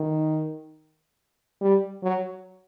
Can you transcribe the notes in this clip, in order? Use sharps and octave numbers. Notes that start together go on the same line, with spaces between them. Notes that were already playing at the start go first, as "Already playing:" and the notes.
Already playing: D#3
G3
F#3